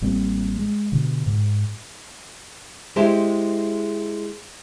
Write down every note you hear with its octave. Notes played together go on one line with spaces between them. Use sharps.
A1 G3 A#3 C4
G#3
B2 D3
G#2
G#3 E4 G4 C5